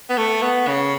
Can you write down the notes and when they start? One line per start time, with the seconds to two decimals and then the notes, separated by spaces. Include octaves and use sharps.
0.10 B3
0.18 A3
0.42 B3
0.68 C#3